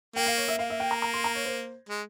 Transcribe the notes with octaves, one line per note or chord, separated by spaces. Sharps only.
A#3 G5
F5
C#5
E5
A#3 F5
E5
G5
A#5
A#5
C6
A#5
C#5
C5
G#3